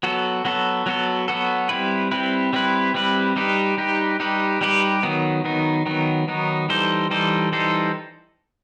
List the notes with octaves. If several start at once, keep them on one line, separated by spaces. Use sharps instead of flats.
F#3 B3 F#4 A4
F#3 B3 F#4 A4
F#3 B3 F#4 A4
F#3 B3 F#4 A4
G3 C4 E4 B4
G3 C4 E4 B4
G3 C4 E4 B4
G3 C4 E4 B4
G3 D#4 G4 B4
G3 D#4 G4 B4
G3 D#4 G4 B4
G3 D#4 G4 B4
D#3 F#3 B3 D#4
D#3 F#3 B3 D#4
D#3 F#3 B3 D#4
D#3 F#3 B3 D#4
E3 G3 D#4 A4 C5
E3 G3 D#4 A4 C5
E3 G3 D#4 A4 C5